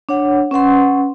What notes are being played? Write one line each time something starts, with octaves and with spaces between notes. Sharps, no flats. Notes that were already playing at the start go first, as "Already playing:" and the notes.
D4 C#5 F#5
C#4 B4 F#5 C6